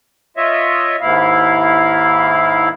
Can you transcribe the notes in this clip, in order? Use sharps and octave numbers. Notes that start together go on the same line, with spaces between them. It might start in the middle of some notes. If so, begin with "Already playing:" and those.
F4 C#5 D#5 E5
D#2 G#2 E4 F5